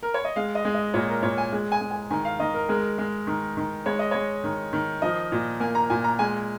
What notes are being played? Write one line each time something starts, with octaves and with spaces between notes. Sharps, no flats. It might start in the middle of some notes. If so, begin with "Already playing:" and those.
A#4
C#5
D#5
G#3 F5
D#5
G#3
D#5
A#2 C#5
A#4
A#2 C#5
G#5
G#3
G#5
G#3
G#5
D#3 G#5
F5
D#3 D#5
A#4
G#3 A#4
G#3
D#3
D#3
G#3 C#5
D#5
G#3 C#5
D#3
D#3
F3 D#5
A#2
A#3 G#5
A#5
A#2 G#5
A#5
G#3 G#5